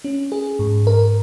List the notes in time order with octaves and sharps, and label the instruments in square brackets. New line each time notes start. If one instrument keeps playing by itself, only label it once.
[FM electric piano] C#4
G#4
G#2
A#4